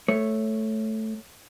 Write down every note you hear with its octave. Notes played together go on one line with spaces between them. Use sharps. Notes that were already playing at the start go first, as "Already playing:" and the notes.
A3 C#5